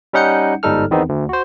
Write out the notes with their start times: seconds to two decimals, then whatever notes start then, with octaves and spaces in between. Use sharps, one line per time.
0.13 G3 C#4 D#4 F#5 G6 C#7
0.63 G1 G#2 G3 D#4 A4 F6
0.91 E2 D#3 B3 C4 D#4
1.09 D2
1.29 F#4 C5